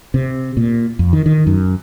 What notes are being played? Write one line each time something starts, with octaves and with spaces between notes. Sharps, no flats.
C3
A#2
F2
D#3
D#3
F#2